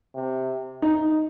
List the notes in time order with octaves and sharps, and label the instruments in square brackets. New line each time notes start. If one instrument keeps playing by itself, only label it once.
[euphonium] C3
[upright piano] D#4